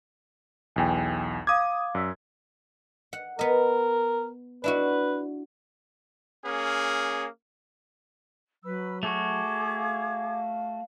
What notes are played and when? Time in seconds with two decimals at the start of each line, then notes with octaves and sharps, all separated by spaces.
0.76 B1 E2 G5 G#5
1.47 F5 D6 D#6 G#6
1.95 F#2 D5 E6 B6
3.13 F#5
3.39 B3 A#4 D#5
4.64 D4 E4 F#4 B4
6.45 A#3 C#4 G#4
8.64 F#3 B4 B5 E6
9.03 A3 F#4 G#4 D6 G#6
9.76 F5